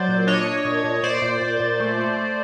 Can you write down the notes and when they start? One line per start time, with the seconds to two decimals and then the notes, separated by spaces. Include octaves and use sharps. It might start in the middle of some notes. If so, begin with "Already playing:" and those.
Already playing: F#3 C5 D5
0.09 A#2
0.27 D4 C#5 D#5
0.46 D4
0.65 A#2
0.84 A#2
1.03 A#2 C5 D5
1.22 A#2
1.42 A#2
1.60 A#2
1.80 A3
1.98 A3
2.17 A3